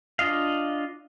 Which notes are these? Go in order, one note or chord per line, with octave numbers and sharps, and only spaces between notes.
D4 F4 D#5 F5